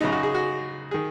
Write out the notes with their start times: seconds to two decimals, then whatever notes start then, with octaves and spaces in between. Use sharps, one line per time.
0.01 F#2 C#3 D#4
0.12 F#4
0.23 G#4
0.34 F#4
0.91 D#3 G#4